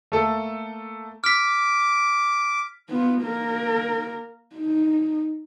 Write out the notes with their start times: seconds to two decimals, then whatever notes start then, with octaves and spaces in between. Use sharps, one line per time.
0.12 A3 A#3 A4
1.24 D6 F6 B6
2.89 B3 F4
3.22 A#3 A#4
4.55 D#4